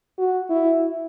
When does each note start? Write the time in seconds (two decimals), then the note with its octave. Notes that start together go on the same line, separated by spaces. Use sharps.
0.19 F#4
0.50 E4